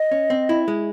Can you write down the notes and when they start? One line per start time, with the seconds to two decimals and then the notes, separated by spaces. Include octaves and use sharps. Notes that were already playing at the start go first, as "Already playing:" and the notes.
Already playing: D#5
0.11 C#4
0.30 C4
0.49 E4
0.68 G#3